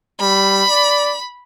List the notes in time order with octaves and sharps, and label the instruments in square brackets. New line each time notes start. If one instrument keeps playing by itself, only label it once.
[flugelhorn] G3 [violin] B5
[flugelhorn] D5